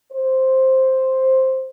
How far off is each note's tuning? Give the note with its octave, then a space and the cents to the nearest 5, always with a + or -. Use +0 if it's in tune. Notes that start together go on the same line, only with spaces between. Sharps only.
C5 +5